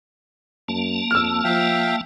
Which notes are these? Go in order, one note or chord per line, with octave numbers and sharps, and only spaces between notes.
F#2 A#3 A5
F2 E6 F6
F3 E5 F5 G5